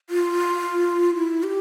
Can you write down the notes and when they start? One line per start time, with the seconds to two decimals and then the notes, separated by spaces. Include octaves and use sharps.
0.10 F4
1.16 E4
1.43 G4